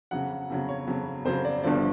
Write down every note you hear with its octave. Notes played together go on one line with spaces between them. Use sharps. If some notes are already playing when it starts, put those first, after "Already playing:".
F2 C#3 F#3 F#5
F2 C#3 F#3
C#5
F2 C#3 F#3
F2 C#3 F#3 C5
D5
G1 G2 D3 F3 D5